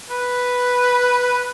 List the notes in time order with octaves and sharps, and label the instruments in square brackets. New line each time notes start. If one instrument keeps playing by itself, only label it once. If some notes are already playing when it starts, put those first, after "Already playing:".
[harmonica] B4